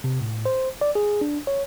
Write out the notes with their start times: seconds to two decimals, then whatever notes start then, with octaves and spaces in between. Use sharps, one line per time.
0.04 C3
0.21 A2
0.45 C5
0.81 D5
0.95 G#4
1.21 D4
1.47 C#5